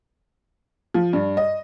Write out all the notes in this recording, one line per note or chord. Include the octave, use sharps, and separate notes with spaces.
F3
G2
D#5